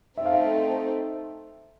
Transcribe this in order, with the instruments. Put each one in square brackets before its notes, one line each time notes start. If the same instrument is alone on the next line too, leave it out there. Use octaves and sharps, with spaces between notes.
[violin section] A3 C4 D#4 [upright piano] E5
[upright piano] F5
E5